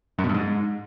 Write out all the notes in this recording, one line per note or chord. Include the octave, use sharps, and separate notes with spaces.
F#2
B2
G2
G#2